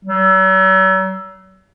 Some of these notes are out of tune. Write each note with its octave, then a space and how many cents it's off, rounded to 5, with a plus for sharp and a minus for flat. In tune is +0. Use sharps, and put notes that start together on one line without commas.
F#3 +40